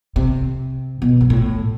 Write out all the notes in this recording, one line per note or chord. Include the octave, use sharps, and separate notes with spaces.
C3
B2
G2
A2